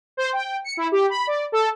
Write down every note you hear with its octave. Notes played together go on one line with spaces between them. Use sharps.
C5
G5
C#7
E4
G4
B5
D5
A4